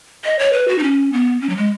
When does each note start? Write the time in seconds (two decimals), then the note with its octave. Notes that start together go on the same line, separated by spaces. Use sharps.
0.25 D#5
0.39 C#5
0.53 B4
0.68 F#4
0.78 D#4
0.83 C#4
1.13 B3
1.41 C#4
1.49 F#3
1.57 G#3